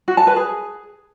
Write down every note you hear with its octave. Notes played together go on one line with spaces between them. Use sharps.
F#4
A5
B4
G#4